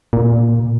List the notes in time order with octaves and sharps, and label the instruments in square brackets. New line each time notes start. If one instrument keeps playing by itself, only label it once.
[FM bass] A#2